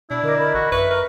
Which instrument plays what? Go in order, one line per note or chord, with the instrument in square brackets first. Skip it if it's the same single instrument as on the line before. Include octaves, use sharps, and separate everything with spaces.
[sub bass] B2 [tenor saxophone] D4 [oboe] E4 [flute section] B5
[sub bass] D3 [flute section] A#4 D#5 D6
[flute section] A#4 D#5 B5
[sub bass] A1 [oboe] F#4
[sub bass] F#2 [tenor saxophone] B4 [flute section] E5 [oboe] C#6
[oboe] A#4 [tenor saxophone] B4